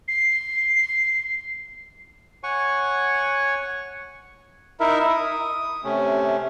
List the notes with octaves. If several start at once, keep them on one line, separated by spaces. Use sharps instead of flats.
C7
C7
C#5 F#5 G#5 C#6
D#4 E4 A#4 E5
D#6
C3 A3 C#4